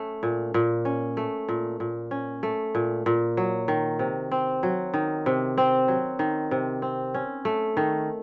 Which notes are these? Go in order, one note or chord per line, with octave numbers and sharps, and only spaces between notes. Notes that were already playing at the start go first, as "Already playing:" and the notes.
Already playing: A3 C#4
A#2
A#2
C#4
A3
A#2
A#2
C#4
A3
A#2
A#2
F#3
D#3
C3
C4
F#3
D#3
C3
C4
F#3
D#3
C3
C4
C#4
A3
D#3